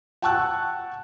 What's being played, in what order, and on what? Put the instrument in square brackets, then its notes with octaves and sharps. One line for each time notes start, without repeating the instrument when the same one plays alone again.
[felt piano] F#5 G5 A5 C#6 E6 F#6